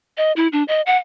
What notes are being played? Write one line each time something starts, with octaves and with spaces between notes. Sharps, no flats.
D#5
E4
D4
D#5
F#5